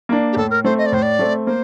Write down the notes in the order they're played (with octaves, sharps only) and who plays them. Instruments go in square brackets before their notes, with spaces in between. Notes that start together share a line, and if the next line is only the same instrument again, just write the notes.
[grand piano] A#3 D4
[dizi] G4
[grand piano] A2 [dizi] A4
[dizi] A#4
[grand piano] A3 C4 [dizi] C5
[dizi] D#5
D5
[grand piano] A2 [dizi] C5
[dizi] D5
[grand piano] A3 C4
[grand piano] A#3 [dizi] C5